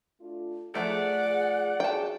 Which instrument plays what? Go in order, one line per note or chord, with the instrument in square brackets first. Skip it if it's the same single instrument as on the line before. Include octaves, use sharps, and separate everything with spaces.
[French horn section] A3 D4 F4
[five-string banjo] F3 A3 [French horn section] G#4 [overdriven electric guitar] D5 [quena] F#5
[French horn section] F3 F#4 G#4 [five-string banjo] G5 A5